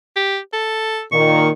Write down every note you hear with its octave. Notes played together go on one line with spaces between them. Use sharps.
G4
A4
A#2 D#3 C#6